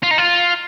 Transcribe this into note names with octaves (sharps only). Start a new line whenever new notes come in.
F4
D#4
F4